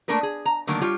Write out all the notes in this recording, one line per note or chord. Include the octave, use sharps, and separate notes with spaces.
A3 A#3 D4 A#4 B4
G#4
A#5
D3 D#3 F#3 A3 A#3
G3 F4 G4 C#5